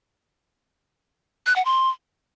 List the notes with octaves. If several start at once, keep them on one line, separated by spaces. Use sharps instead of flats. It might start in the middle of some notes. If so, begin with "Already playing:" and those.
F#6
F#5
C6